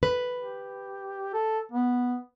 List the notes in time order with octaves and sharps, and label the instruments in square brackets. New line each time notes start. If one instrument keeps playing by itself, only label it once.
[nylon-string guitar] B4
[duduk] G4
A4
B3